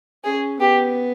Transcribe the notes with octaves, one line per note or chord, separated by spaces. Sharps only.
C#4 G#4
B3 G4